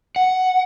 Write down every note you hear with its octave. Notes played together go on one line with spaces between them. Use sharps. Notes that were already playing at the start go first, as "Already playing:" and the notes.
F#5